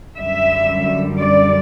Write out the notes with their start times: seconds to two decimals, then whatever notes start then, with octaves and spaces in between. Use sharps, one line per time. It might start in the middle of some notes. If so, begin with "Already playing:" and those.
0.17 F#2 D3 G3 E5
1.21 D5